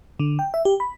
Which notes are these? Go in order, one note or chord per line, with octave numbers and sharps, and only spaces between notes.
D3
G5
E5
G4
B5